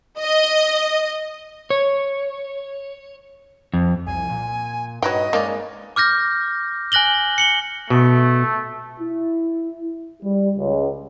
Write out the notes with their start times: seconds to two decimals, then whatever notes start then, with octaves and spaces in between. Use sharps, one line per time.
0.20 D#5
1.70 C#5
3.74 F2
4.07 C2 G#5
4.30 A#2
5.02 G2 D#4 F#4 B4 C#5 D#5 G5
5.33 G#3 A#3 C#4 D#4 D5
5.96 D6 F6 G6 A#6
6.92 G#5 F#6 A#6 F#7 G7
7.38 C#7 F#7 G7
7.90 B2 A3
9.00 E4
10.23 G3
10.57 C#2